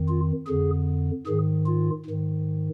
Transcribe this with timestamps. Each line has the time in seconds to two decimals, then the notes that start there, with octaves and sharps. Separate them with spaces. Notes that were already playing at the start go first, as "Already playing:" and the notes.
Already playing: F2 D#3
0.08 F4
0.47 F2 D3 G#4
1.27 G#2 D#3 G#4
1.66 F4
2.06 G#2 D#3